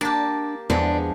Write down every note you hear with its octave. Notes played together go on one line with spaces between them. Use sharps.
A#3 D4 G4 A5
E2 F3 G#3 B3 D4